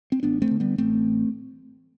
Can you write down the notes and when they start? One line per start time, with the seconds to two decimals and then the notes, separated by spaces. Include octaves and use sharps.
0.12 C4
0.23 A1 B3 D4
0.42 A3 C4
0.51 D3
0.60 G3 B3
0.78 A1 A3 C4